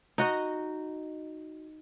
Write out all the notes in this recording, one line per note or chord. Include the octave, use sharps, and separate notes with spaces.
D#4 F#4 D#5